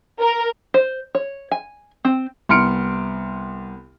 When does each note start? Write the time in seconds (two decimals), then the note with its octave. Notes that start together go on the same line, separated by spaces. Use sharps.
0.20 A#4
0.74 C5
1.15 C#5
1.52 G#5
2.05 C4
2.49 C2 B3 C6 F6 C#7 D7